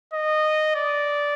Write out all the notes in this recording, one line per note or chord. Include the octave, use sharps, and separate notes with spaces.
D#5
D5